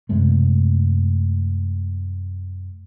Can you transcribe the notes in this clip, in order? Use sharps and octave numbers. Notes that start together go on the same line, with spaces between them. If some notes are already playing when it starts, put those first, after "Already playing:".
F#2 C3 G#3 A3